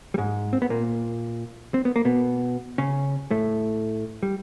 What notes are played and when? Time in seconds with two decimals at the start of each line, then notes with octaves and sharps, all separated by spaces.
0.14 G3
0.18 G#2 G#3
0.53 C4
0.62 B3
0.70 A#2 A#3
1.74 C4
1.85 B3
1.96 A#3
2.05 B2 B3
2.78 C#3 C#4
3.31 A2 A3
4.23 G3